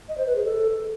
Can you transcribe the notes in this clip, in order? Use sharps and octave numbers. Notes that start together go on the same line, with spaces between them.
D#5
C5
B4
G#4
A4